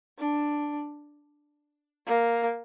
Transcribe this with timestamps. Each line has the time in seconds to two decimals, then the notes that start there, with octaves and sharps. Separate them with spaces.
0.18 D4
2.06 A#3